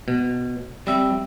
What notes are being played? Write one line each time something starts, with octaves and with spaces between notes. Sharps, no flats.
B2
G3 C4 E5